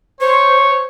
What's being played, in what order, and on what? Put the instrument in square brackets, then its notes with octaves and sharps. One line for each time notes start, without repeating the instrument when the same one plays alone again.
[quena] C5 [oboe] C#5